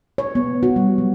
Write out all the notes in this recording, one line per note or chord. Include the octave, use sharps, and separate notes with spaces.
C#5
B3
F#4
G3
F#3